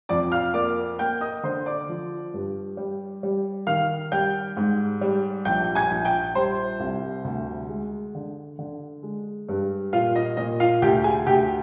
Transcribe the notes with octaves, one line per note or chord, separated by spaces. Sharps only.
F2 D5 D6
F5 F6
A#3 D5 D6
A#3 G5 G6
D#5 D#6
D3 C5 C6
D5 D6
F3
G2
G3
G3
D#3 F5 F6
G3 G5 G6
G#2
G3
A#1 G5 G6
G#5 G#6
A#1
G5 G6
G3 C5 C6
C2
D2
G#3
D3
D3
G#3
G2
A#2 F4 F5
D#5
A#2 D#5
F4 F5
D2 G4 G5
G#4 G#5
D2 G4 G5